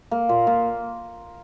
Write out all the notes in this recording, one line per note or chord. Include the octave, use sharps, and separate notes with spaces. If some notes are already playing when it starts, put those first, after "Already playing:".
A#3
A#2
A#2